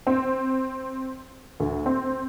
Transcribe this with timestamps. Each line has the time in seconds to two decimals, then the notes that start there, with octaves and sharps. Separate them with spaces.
0.07 C4
1.60 D2
1.86 C4